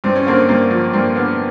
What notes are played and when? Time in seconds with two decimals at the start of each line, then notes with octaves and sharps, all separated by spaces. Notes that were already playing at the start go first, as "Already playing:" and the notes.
0.04 G2 C4
0.16 C#4
0.27 D3 A#3 C4
0.49 G2 A#3 C4
0.70 F3
0.93 G2 A#3 C4
1.16 D3 B3